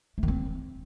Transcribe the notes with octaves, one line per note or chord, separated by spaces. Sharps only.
A3
D#3
C4